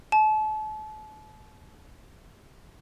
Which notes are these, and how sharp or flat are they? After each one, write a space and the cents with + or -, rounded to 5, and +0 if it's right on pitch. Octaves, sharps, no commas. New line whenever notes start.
A5 -35